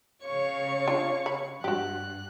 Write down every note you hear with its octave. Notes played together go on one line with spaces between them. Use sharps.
C#3 C#5 F5 C#6
D4 F4
B5
G2 F#4 G4 F#6